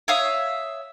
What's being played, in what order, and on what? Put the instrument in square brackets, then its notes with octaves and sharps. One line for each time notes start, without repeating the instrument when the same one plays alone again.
[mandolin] C#5 E5 F5 D#6